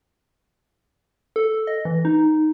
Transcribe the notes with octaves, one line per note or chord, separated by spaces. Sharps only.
A4
D#5
E3
D#4